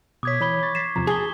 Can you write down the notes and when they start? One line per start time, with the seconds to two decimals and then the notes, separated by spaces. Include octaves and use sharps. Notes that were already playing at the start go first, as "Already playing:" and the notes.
0.23 B2 C#5 D6 D#6 G#6 B6
0.41 E3 C#5 B5 G7
0.63 C#6 A6
0.75 B6 C7 E7
0.96 E2 C3 F3 A#5
1.07 G#4 A5 D#6 G7